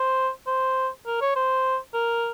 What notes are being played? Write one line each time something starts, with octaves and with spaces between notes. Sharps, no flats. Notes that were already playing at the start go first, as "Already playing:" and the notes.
Already playing: C5
C5
A#4
C#5
C5
A#4